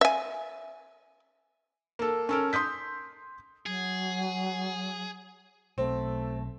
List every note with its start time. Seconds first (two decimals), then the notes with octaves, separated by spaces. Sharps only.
0.01 E5 G#5
1.99 A#3 A4
2.29 C#4 A4 A#4
2.53 C6 D#6 G6 B6
3.66 F#3 G#4
5.78 B1 A3 C4